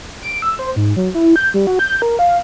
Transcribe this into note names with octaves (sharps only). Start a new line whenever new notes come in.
D7
E6
C5
G#2
F#3
E4
G6
G3
F#4
G6
A#4
F5